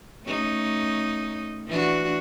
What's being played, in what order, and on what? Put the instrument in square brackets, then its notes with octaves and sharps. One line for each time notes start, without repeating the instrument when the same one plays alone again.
[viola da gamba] A3 C#4 D#4
E3 D4 F#4